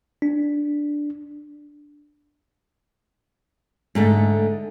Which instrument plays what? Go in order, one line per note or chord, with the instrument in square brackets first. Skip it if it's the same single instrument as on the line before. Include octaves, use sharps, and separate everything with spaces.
[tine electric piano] D4
[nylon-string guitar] G#2 D3 A3